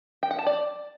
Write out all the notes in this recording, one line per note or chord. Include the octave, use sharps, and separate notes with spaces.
G5
F#5
A5
D5